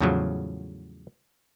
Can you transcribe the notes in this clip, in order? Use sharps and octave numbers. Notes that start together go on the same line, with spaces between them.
E2 A2 C#3 F3 F#3